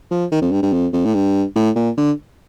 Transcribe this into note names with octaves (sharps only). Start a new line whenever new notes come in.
F3
D#3
F2
G2
G2
F2
F2
A2
G2
A2
A#2
D3